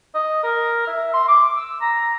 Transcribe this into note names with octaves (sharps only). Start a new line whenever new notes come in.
D#5
A#4
E5
C6
D6
E6
A#5